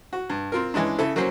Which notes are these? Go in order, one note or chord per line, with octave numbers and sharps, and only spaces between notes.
F#4
G2
C4 F4 A#4
E3 G#3 C#4 D4
C#3 E4 A4
F#3 A#3 C#4 C5